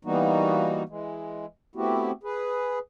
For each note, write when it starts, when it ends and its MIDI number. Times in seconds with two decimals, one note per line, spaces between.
0.05 0.83 52
0.05 0.83 55
0.05 0.83 58
0.05 0.83 59
0.05 0.83 63
0.05 0.83 66
0.89 1.46 52
0.89 1.46 56
1.76 2.11 57
1.76 2.11 59
1.76 2.11 60
1.76 2.11 64
1.76 2.11 66
1.76 2.11 67
2.23 2.79 68
2.23 2.79 71